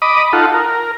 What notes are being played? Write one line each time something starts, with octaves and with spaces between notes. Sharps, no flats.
D#5 B5 D6 D#6
D#4 F4 A4 F#5
A#4